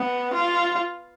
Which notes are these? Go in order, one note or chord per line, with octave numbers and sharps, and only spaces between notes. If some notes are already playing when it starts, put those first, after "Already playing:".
Already playing: B3
F4